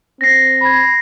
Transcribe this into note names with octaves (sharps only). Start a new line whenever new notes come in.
C4 A#6 C7
B5 G#6